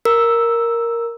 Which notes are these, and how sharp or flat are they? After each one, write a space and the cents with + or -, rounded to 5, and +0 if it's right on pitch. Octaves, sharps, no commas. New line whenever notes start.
A#4 +0 E6 +0